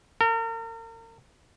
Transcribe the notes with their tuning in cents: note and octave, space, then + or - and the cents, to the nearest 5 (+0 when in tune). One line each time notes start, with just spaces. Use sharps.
A#4 -40